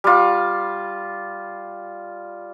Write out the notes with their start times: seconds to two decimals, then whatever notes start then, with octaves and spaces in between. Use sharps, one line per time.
0.04 G3 F4